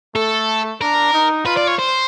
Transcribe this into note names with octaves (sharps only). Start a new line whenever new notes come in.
A3 A4
D4 A#4
D#4
F4 B4
D5
C#5
C5